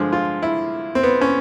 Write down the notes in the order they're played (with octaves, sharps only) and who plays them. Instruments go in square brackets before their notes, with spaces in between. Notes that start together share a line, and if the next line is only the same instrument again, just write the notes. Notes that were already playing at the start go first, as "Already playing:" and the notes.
Already playing: [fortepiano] G2 D3 F3 G#3
F4
E4
C4
B3
C#4